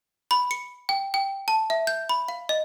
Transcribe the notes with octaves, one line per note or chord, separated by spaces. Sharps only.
B5
C#7
G5
G5
A5
E5
G6
B5
F5
D#5